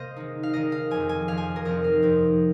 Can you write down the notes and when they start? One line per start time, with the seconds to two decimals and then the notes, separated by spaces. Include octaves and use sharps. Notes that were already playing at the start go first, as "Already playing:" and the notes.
Already playing: C3 A#3 C5 D#5 F5
0.16 D#3 G#3 D#4
0.43 F5
0.53 D#3 G#3 D#4 D#5
0.72 F5
0.91 F2 C3 F3 G#5
1.09 G#5
1.28 F2 C3 F3 F5
1.37 G#5
1.56 A#4
1.65 F2 F3 C4 D#4 D#5
1.84 F5
2.02 F2 F3 C4 D#4